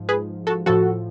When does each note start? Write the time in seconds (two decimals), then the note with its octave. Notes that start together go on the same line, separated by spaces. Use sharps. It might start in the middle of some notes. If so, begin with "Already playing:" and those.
Already playing: G#2 F3
0.09 G#4 B4
0.47 F#4 A4
0.66 A2 F3 F#4 A4